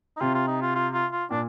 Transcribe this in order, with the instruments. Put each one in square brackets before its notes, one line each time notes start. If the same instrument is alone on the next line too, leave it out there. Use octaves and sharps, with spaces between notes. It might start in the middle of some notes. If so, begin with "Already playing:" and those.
[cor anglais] D#4
[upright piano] C3 [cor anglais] F4
[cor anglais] F4
D#4
F4
F4
F4
F4
[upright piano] A#2 [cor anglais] D4